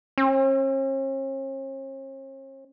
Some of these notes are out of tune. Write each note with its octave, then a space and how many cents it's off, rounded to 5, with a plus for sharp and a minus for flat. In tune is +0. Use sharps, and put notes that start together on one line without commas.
C#4 -45